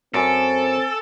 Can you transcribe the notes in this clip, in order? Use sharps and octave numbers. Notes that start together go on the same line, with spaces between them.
F#2 C4 A4 G#5 D7